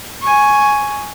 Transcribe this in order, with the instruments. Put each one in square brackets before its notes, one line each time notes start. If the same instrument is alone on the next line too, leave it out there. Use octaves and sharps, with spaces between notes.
[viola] G#5 C#6